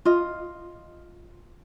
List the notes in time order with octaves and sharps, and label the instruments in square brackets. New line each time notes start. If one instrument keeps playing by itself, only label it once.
[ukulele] F4 D#5